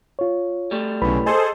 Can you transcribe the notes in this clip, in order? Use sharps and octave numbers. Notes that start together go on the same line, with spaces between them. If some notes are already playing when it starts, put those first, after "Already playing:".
F4 C#5
G3 A3
B1 C#3 E4 B4 B5
G#4 A4 C5 D#5 C6